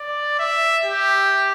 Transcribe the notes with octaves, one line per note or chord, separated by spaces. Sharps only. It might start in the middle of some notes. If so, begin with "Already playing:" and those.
Already playing: D5
E5
G4